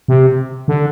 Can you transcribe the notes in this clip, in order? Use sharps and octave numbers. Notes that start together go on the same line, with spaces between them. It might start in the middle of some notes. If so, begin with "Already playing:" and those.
C3
D3